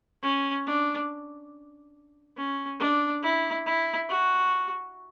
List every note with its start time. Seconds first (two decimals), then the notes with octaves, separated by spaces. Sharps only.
0.23 C#4
0.66 D4
2.37 C#4
2.80 D4
3.23 E4
3.66 E4
4.09 F#4